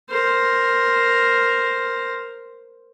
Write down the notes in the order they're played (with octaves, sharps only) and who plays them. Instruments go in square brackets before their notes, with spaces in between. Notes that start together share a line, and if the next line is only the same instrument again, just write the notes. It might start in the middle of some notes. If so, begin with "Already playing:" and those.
[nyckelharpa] A#4 C5